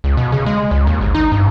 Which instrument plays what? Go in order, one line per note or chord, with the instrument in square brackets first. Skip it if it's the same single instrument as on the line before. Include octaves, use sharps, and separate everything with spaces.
[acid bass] C#2
B2
C#3
G#3
C#2
D#2
G#1
D#4
G2